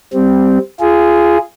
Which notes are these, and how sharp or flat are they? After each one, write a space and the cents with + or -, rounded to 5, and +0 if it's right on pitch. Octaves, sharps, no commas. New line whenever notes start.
G3 +0 C4 -10
F4 -25 G#4 +0